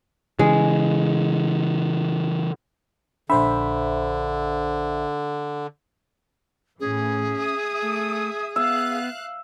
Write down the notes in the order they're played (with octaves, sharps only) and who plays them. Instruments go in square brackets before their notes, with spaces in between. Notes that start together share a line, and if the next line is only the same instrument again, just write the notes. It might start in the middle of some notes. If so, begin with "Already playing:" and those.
[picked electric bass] C#3 E3 [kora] G#3
[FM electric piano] A#1 C5 E5 [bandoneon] D3 [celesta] D4 B5
[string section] A2 E3 [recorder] C#4 [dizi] G#4
[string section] E5 D#6
[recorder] A3
[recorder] B3 [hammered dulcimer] E5 [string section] F5 F#6